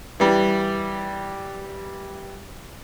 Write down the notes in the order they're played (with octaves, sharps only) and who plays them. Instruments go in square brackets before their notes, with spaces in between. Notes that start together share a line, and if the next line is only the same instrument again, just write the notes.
[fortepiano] E3 G3